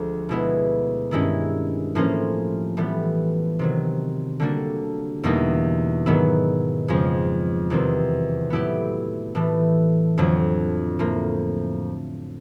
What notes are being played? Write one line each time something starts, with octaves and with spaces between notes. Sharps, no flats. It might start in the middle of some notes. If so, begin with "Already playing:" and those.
Already playing: D2 D3 F3 G#3
B2 G#3 B3 E4
G2 D#3 G#3 C#4 E4
A2 F3 A#3 C#4 F4
A2 E3 G3 B3
C3 D#3 F#3
D3 G3 A#3 D4 F#4
E2 B2 G3 A#3 D#4
G#2 D#3 F#3 B3 E4
F2 C#3 F3 G#3
E2 C3 D#3 G3 C4
A2 F#3 B3 E4 G4
A2 E3 A3
F2 D3 F#3
A2 F3 A#3